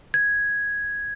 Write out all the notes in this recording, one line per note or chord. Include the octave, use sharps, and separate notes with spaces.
G#6